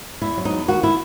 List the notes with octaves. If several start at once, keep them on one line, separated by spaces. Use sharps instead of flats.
E2 E4
F#3
D#4
E2
D#3 F#4
E4